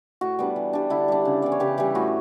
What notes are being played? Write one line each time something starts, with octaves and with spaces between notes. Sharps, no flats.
A2 F#4
G3 B3 D4
E3
G3 D4
D3 E4
G3 D4
C#3
E3 B3 D5
C#5
C#3 G4 B4
E3 G3 E4 G4
A2 F#4